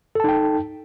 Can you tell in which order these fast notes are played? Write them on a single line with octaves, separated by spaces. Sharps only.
A4 A5 D#4 G5